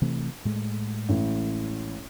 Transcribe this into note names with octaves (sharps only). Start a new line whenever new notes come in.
C3 E3 A3
A2 G#3 A3
A1